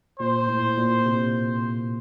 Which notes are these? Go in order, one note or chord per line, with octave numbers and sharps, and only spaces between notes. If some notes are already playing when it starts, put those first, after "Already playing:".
A#2 C5
A2
A#2
C3